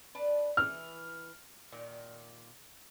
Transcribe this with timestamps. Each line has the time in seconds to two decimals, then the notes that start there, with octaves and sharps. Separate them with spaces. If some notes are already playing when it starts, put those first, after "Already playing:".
0.15 D4 B4 A5
0.57 E3 F6
1.72 A#2 D#3